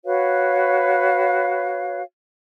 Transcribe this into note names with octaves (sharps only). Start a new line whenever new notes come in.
F#4 B4 C#5 F5